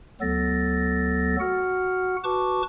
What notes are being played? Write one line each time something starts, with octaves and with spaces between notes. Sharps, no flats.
D2 F#3 B3 A4 A6 A#6
F#4 F#5 F6
F#4 B4 A5 C#6 D6